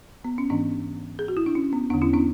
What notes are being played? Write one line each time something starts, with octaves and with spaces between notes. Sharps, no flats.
B3
C#4
G#2 E3 B3 D4
G#4
F#4
E4
D4
C#4
B3
E2 D3 B3 D4
C#4 E4
B3 D4